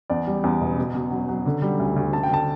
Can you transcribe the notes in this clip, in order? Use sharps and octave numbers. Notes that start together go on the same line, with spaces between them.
E2 D5
G3
E2
E1
B2
B2
F#3
F#3
D3
G3
D2
D2
D2 A5
G5
D3 A5